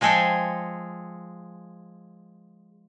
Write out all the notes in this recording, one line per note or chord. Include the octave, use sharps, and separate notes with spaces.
F3 G#3 G#4 A4 G5 G#5